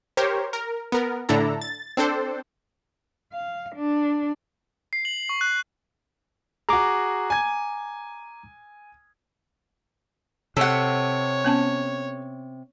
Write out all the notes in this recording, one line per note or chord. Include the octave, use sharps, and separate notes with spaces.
G4 A#4 C5 C#5
A#4
B3 A#4
A2 D3 D4 E4 A4 A#5
A6
C4 D4 A4 C5
F5
D4
C7
F#7
C#6
F#6
F#4 G#4 A#5 D6
G#5 G#6
C3 A4 C#5 F#5
B3 C#4 A5